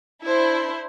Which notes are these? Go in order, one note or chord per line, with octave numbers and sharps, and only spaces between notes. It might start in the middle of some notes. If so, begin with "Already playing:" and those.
D4 E4 C5